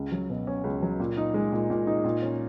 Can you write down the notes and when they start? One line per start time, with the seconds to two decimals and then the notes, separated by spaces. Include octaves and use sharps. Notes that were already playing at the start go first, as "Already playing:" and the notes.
Already playing: C#2
0.12 F#3
0.30 B2
0.47 C#4
0.64 C#2
0.83 F#3
1.00 A#2
1.17 D#4
1.34 G#3
1.52 A#2
1.70 A#2
1.87 D#4
2.05 A#2
2.22 C#4